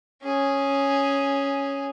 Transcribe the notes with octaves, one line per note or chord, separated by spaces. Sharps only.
C#4 G#4